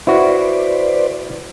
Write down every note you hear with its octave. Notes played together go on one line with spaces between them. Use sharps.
E4 F#4 B4 C5 D5